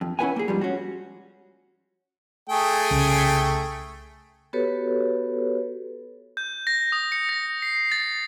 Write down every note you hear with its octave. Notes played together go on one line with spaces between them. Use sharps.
F2
C#4 E4 A4 B4 F#5 G#5
A#3 G#4
G#2 F3 G3
C#4 F#4
A3 G#4 G5
C2 C#3
B3 F#4 G4 A4 B4 C#5
G6
A#6
D#6
C#7
A#6
C7
A6